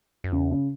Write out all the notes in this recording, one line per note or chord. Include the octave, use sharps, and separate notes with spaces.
F#2
E2 C#3
C#3